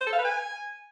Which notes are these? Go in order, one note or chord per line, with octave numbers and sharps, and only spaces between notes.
C5
A4
F5
B4
G#5